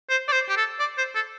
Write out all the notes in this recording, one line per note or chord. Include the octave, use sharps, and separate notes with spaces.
C5
D5
C5
G4
A4
D5
C5
A4